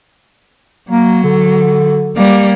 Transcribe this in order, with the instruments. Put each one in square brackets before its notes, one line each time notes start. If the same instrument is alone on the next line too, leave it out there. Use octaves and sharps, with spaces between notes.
[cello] F#3 [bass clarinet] A#3
[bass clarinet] D3
[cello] G3 A#3